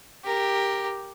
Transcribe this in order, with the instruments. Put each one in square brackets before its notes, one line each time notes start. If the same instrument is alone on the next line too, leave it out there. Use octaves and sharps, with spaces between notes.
[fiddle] G4 A#4